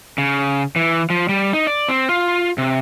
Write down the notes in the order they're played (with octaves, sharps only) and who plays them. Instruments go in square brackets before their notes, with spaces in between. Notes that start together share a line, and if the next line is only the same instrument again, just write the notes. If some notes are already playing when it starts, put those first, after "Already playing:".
[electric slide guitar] C#3
E3
F3
G3
D#4
D5
C4
F4
C3